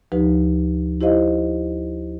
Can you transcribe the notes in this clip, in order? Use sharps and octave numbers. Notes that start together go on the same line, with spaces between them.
D2 F3 D#4 G4 B4
E4 G4 C5 D#5 F5